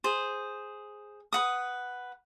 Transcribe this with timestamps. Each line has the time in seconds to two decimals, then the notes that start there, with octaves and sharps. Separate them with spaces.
0.04 G#4 C5
1.33 B4 F#5 D#6